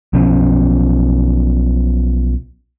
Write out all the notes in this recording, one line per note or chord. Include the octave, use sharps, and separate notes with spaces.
B1 B2 F3 C#4